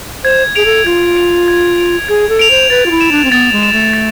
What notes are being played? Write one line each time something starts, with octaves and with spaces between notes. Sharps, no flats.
C5 G#6
G#4 D7 F7
A4
F4 G#6
D7 F7
G#6
D7 F7
G#4 G#6
A4
D7 F7
C5
B4 A6
F4
E4
E7
D4
C4
B3 A6
G#3
E7
A3
A6